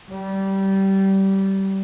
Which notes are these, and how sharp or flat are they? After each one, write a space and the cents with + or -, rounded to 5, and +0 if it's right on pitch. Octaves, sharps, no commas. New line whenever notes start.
G3 -20